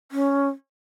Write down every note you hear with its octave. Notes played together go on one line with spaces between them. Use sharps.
C#4